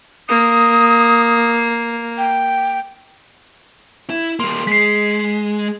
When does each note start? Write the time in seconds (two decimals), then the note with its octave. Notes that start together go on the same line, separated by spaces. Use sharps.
0.29 A#3 D#6
2.18 G5
4.10 E4
4.40 G3 A#3 C6
4.67 G#3 B6 C7